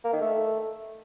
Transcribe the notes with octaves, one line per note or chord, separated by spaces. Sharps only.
A#3
D#3
A3